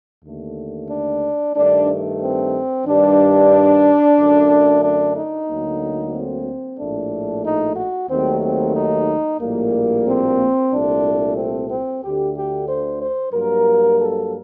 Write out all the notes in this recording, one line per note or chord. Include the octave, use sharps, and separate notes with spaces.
D#2 D3 A3
D4
G2 D#3 A3 D4
C4
G2 D#3 G3 D4
F#2 D3 A3
D4
D#4
D2 D3 F#3 A#3
C4
A#1 A2 A3 D4
D#4
F#4
D#2 D#3 F#3 A3 C4
C4
D#4
A#1 A2 G3 A#3
C4
C2 A#2 A3 D4
C4
C4
D2 D3 A3 G4
G4
C5
C5
G2 F#3 A#3 A#4
A4